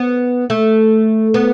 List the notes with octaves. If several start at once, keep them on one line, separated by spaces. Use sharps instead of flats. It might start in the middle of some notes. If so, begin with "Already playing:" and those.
Already playing: B3
A3
B3